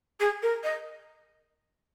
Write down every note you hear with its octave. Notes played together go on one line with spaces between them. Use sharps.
G#4
A#4
D#5